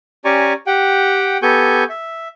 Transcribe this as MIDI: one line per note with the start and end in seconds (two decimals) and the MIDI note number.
0.25 0.53 61
0.25 0.53 67
0.25 0.53 74
0.25 0.53 80
0.25 0.53 82
0.25 0.53 85
0.67 1.38 67
0.67 1.38 78
0.67 1.38 79
1.42 1.84 59
1.42 1.84 67
1.42 1.84 69
1.42 1.84 80
1.42 1.84 85
1.42 1.84 91
1.90 2.28 76